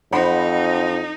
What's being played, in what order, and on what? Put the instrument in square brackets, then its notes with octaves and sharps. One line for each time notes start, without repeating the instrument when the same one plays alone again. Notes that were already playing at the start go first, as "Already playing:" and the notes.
[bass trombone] F2 [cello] D#4 [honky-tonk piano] C5 F#5 B5